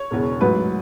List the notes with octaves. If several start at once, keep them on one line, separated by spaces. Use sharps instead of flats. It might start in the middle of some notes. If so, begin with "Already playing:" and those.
Already playing: C#5
E1 E2 C#3
A1 G#2 F#3 B4